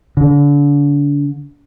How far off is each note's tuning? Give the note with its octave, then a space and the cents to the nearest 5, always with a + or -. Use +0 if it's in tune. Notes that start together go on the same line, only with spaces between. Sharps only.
D3 -35